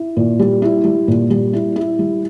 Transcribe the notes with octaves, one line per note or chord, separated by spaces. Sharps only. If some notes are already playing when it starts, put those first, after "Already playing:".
Already playing: E4
A#2
G3
E4
G3
A#2
G3
E4
E4
G3